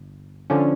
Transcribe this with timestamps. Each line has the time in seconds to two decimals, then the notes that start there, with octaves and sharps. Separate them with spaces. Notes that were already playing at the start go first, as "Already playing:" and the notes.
Already playing: G1
0.50 D3 F3 C#4